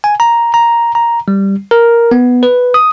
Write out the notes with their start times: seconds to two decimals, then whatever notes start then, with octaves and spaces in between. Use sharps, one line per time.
0.04 G#5
0.20 A#5
0.54 A#5
0.95 A#5
1.28 G3
1.71 A#4
2.11 B3
2.43 B4
2.74 D#6